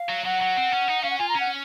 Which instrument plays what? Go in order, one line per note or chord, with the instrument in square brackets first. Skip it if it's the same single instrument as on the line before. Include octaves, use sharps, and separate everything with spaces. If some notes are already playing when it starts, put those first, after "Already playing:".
Already playing: [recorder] F5
[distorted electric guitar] F#3
[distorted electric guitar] F#3 [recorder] F#5
[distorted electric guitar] F#3
C4
C#4
D#4
[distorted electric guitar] C#4 [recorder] F5
[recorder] F#5
[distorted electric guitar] F4 [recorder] G#5
[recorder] A#5
[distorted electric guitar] C#4
[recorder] F#5